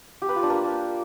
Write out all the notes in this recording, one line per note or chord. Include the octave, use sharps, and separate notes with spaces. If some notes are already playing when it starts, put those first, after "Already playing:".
G4
B4
F4
D4
A#3